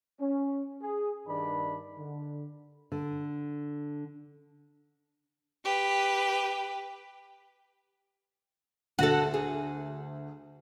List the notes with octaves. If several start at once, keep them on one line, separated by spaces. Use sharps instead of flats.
C#4
G#4
G2 D#3 D4 D5 B5
D3
D3
G4 B4
D2 F#4 A4
G#4